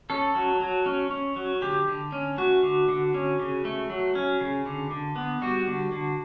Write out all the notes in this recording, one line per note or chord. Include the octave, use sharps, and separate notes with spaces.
C#4 A4
F#3
F#3
C#4
C#4
F#3
D3 G4
D3
C#4
A3 F#4
D3
D3
C#4
C#3
A3
F#3
C#4
C#3
D3
D3
B3
G3 F#4
D3
D3